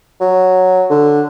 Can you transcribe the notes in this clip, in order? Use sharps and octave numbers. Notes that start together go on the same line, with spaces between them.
F#3
D3